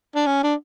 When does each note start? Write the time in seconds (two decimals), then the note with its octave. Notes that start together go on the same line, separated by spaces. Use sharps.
0.15 D4
0.26 C#4
0.44 D4